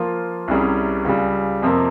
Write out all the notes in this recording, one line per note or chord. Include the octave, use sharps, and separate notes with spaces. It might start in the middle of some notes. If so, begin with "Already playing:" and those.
Already playing: F3 A#3 F4
C2 C3 G3 C#4 G#4
C#2 C#3 G3
F2 C3 F3 A#3